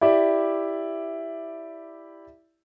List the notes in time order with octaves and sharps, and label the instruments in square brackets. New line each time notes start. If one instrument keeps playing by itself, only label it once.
[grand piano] E4 G4 D5 E5